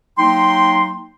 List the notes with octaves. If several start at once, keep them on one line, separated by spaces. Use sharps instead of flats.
F#3 A#3 D#4 G5 C6